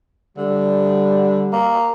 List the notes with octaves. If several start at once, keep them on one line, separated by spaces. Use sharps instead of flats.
D3 G3
A#3